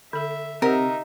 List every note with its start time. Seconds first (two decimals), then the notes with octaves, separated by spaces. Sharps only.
0.13 D3 A4 E5
0.62 C3 D#4 G4 A#4 E5 F#5